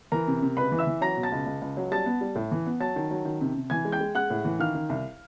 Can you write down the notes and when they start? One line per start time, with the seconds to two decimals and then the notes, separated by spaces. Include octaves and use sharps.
0.12 E3 A#4 A#5
0.28 C3
0.42 C3
0.57 C#2 B4 B5
0.72 E3
0.79 E5 E6
0.87 E3
1.01 F#3 A#5 A#6
1.17 B2
1.23 A5 A6
1.32 C#2
1.46 C#2
1.61 C#2
1.77 F#3
1.91 G3 A5 A6
2.06 B3
2.21 G3
2.35 A2
2.51 E3
2.67 B3
2.80 F#3 A5 A6
2.96 D#3
3.11 F#3
3.25 D#3
3.41 C3
3.55 C3
3.70 E3 G#5 G#6
3.85 G#3
3.92 G5 G6
4.01 G#3
4.15 G#3 F#5 F#6
4.30 A2
4.45 E3
4.60 D#3 F5 F6
4.75 D#3
4.89 C2